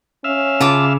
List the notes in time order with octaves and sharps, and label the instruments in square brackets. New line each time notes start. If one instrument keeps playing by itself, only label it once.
[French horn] C#4 [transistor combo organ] E5 F5
[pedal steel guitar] C#3 [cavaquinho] F4 A5 D6